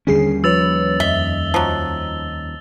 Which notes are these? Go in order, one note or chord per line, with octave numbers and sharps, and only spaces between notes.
D#2 D3 G3 C#4 G#4 C7
F3 B4 C#5 E6 A6 F7
F2 D#5 E5 G7
F3 F#3